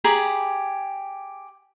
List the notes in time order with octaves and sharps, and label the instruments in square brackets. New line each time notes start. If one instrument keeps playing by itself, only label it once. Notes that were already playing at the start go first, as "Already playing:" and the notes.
[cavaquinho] G4 G#4 A#5 B5